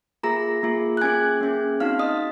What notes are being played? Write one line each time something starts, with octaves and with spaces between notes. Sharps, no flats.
A#3 F4 G#4 A#5 A#6
A#3 F4 G#4
F#6
A#3 C#4 G#4 G#5 G#6
A#3 C#4 G#4
C4 D#4 F#4 F5 F6
D#5 D#6